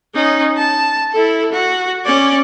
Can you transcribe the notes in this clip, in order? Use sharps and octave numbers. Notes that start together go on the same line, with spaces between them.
C#4 D#4
A5
E4 A4
F#4
C#4 D5